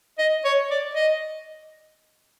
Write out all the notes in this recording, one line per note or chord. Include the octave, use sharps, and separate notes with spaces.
D#5
C#5
D5
D#5